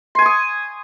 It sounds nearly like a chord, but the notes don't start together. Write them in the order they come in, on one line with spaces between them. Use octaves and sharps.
C6 G#5 C#6 D#6